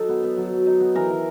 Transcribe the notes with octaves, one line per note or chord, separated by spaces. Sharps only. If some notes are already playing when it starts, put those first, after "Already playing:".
Already playing: F#3 D#4 A4
B3
B3
F#3
F#3
D#4
B3
E3 A#4
E3